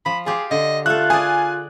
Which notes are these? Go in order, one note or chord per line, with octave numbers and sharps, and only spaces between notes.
F3 B5
F4 G4 G#4
D3 D#5
A3 F4 A4 F#6
G#4 D5 G#5